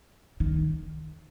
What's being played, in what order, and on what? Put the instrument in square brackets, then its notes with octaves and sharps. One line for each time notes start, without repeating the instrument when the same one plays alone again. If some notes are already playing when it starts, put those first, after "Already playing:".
[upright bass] D#3